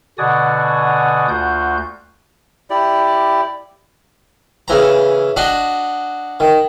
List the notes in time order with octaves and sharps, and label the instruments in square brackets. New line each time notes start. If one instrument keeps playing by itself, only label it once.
[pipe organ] B2 D3 F#4 D5 G#5 D#6
D2 F4 F#4 G6
[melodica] E4 G4 D5
[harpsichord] C#3 E3 A#5
D4 F#4 D#5
D#3